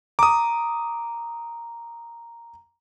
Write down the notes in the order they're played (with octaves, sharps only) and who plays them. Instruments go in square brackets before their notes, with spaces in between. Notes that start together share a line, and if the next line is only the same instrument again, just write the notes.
[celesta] A#5 [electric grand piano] D6 D#6